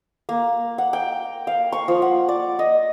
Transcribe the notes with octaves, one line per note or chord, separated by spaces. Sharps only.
A#3
F#5
G5
F5
C#6
F3
F#5
D5
D#5